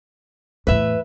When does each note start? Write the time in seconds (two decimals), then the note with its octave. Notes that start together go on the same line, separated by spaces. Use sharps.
0.67 E2 A2 B4 E5